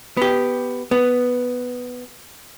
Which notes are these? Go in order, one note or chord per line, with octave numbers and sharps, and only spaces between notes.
B3 G4
B3